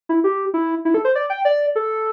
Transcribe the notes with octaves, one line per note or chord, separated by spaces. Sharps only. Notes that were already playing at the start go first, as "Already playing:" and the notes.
E4
G4
E4
E4
A4
C5
D5
G5
D5
A4